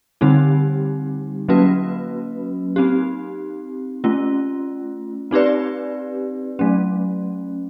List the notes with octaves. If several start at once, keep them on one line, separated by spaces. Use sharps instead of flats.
D3 G3 C4 D#4 G4
F#3 A#3 C#4 F#4 B4
C4 D#4 G4
A3 C#4 F4
C4 D#4 G4 B4 D5
F#3 A3 C#4